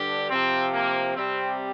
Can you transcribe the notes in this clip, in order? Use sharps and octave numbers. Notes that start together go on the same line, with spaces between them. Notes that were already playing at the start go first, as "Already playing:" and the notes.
Already playing: G2 D3 G3 G4
C3 F3 C4
A#3
C3 G3 C4